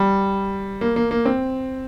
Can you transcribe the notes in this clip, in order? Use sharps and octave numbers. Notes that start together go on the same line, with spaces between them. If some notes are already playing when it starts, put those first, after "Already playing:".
Already playing: G3
A#3
A#3
A#3
C4